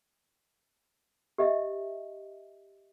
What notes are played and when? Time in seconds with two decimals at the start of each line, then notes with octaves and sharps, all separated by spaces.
1.38 G4 D#5 E5